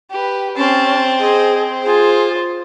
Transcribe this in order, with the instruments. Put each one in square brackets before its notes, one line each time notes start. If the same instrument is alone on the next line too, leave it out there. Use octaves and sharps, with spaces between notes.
[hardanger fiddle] G4 B4
[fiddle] C4 [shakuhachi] C#4 [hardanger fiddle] A5
[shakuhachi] G#4 [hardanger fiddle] C5 D#5
[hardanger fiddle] F4 C5 [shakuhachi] G#4